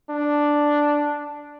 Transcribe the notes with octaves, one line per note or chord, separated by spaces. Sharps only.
D4